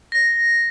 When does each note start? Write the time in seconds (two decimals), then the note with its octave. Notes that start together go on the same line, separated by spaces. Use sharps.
0.12 A#6